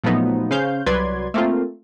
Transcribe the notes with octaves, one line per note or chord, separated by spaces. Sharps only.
A#2 F3 F#3 A3 B3 D#4
C#3 C#4 C5 F5 G6
C2 F#3 B4 D5 C6 G#6
A3 A#3 C4 F4